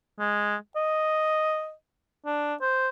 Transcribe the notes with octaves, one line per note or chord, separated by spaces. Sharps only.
G#3
D#5
D4
C5